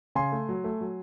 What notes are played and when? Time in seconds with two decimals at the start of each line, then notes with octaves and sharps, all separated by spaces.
0.15 C#3 G#5 C6
0.32 A3
0.49 F#3
0.64 A3
0.81 F#3